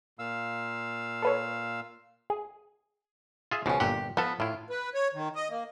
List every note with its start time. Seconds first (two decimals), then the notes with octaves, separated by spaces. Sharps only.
0.19 A#2 F5 E6
1.22 A4 B4 C#5
2.30 G#4
3.51 F4 G#4 E5
3.66 C#2 B2 F3 C#4
3.80 G1 A#2 G4 F#5
4.17 F3 B3 A4
4.40 A2 E4 F4
4.70 B4
4.94 C#5
5.14 D#3
5.36 D#5
5.50 A#3